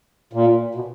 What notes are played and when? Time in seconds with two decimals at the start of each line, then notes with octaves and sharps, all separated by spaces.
0.33 A#2
0.75 B2